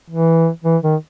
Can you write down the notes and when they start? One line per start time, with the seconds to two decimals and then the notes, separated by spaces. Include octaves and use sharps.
0.10 E3
0.64 E3
0.83 D#3